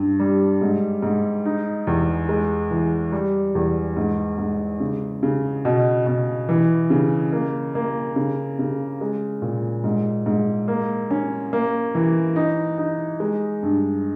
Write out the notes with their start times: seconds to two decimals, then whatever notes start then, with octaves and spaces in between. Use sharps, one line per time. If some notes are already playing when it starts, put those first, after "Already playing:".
Already playing: G2
0.19 G3
0.61 G#2
1.02 G#2
1.45 D#4
1.87 E2
2.29 G#3
2.71 E3
3.12 G3
3.55 E2
3.97 G#2
4.38 G#2
4.80 C#3
5.23 C#3
5.65 B2
6.07 B2
6.49 E3
6.90 C#3
7.33 A#3
7.75 A#3
8.16 C#3
8.59 C#3
9.01 G#3
9.42 A#2
9.84 G#2
10.26 G#2
10.68 A#3
11.11 C#4
11.53 A#3
11.95 E3
12.36 D#4
12.78 D#4
13.20 G#3
13.63 G2